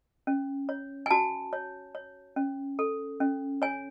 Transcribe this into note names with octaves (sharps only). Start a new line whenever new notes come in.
C#4
C#5
G#5
F#4 A5
C#5
C#5
C#4
A4
C#4
C#5 G#5